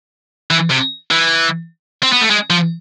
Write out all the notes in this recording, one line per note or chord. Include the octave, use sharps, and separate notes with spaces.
E3
C3
E3
C4
B3
A3
G#3
F3